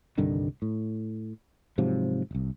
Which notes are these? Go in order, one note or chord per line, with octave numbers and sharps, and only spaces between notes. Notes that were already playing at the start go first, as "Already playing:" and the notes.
C2 G2 D3 D#3
A2
G#2 C3 F3 F#3
D1 C2